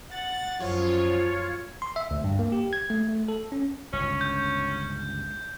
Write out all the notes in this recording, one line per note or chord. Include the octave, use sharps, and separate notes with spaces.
F#5 A6
F#2 F3 F4 C#5
C6
E5
D2
G2
A#3
G4
G#6
A3
A3
A4
C#4
G1 C#2 C#4
G6